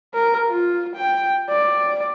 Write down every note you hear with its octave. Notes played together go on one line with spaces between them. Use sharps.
A#4
F4
G5
D5